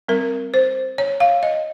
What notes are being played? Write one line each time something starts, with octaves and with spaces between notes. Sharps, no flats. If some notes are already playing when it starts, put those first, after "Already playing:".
G3 C4 A#4
C5
C#5
F5
D#5